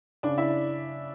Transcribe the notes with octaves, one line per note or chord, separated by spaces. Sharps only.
C#3 D4 D5
E4 E5